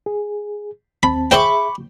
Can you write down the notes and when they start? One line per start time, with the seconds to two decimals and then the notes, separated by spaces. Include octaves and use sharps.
0.06 G#4
1.03 D#2 C4 A5 B5
1.31 G#4 C5 E5 G5 B5 C#6 D6